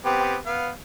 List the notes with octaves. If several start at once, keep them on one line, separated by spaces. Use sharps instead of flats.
B3 C4 G4
B3 F5